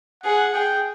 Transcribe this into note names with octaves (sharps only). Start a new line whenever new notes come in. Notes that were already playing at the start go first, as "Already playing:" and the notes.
G#4 F#5
G#4 G5